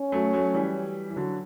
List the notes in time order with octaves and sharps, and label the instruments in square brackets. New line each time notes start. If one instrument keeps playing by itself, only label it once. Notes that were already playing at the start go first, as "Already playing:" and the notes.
Already playing: [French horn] C#4
[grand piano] F#3 A3
F#3 A3
E3 G3
E3
D3 F#3